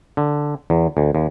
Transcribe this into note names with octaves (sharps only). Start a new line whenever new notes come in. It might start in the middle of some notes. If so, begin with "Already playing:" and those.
D3
E2
D2
D#2